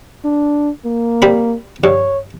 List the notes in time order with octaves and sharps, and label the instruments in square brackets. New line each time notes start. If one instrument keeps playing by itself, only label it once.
[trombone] D4
A#3
[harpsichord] G3 C4 B5
[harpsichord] G2 [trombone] C#5